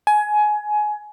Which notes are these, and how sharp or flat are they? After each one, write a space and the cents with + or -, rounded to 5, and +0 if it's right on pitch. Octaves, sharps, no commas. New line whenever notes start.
G#5 +20